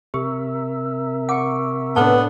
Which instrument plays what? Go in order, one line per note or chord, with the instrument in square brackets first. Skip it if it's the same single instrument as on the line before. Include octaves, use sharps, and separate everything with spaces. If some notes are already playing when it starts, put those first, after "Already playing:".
[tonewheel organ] C3 A#4 E5 [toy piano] G4
[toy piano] F#5 [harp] C#6 D6
[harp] A2 D4 [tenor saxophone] B3 [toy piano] B4 A5